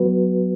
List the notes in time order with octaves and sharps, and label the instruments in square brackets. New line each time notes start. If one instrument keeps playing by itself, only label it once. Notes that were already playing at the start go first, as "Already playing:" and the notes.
Already playing: [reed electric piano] F#3 B3 F#4 B4